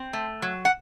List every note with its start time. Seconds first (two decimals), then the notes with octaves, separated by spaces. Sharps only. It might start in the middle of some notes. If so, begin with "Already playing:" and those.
Already playing: C4
0.13 A3
0.42 F#3
0.65 F#5